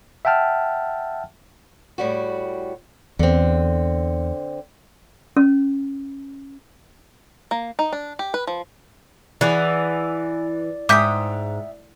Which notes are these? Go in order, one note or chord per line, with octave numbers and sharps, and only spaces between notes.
E5 F#5 G5 A5 F6
A2 G3 F#4
E2 D3 C4
C#4
A#3
D#4
D4
G4
B4
F3
E3 G#4 D5 F#5 G#5
G#2 E5 G5 D6 D#6 G6 B6